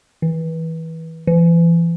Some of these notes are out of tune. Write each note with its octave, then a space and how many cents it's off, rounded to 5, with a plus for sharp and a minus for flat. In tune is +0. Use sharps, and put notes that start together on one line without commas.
E3 -25
E3 +35